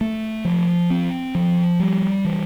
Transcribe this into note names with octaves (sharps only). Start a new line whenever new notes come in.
A3
F3
C4
F3
G3
E3